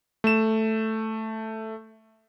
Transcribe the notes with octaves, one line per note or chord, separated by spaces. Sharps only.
A3 E7